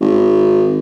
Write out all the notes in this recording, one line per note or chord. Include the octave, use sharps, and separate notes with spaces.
G#1